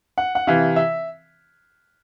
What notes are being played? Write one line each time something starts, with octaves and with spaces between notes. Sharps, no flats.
F#5
F#5
C3 E3 F5
E5